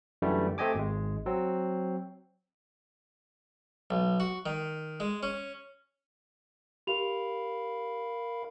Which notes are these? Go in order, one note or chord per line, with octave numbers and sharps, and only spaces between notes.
F#2 D3 E3 G3 A3
A3 C4 G4 D#5 G#5 D6
G#1 G#3
F#3 C4
B1
F#4
D#3
G#3
C#4
G4 A#4 F5 B5 F7